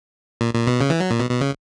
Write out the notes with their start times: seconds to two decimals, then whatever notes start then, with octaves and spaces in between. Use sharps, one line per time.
0.41 A#2
0.54 A#2
0.67 B2
0.81 C#3
0.90 E3
1.00 F#3
1.11 A#2
1.20 B2
1.31 B2
1.41 C#3